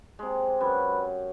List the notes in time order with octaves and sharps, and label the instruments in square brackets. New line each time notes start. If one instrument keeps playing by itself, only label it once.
[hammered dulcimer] C3 G#3
[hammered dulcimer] F#2 [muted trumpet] B4